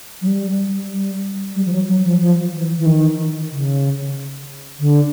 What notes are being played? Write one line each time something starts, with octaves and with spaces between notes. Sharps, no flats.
F#3
G3
G3
G3
F3
F#3
F#3
F3
F3
E3
E3
D#3
C#3
D3